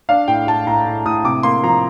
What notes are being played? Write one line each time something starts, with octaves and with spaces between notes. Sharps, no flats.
D4 F5
A2 G5
A2 A5
A2 A#5
A2
A2 D#6
C3 D6
A#3 C6
F3 A#5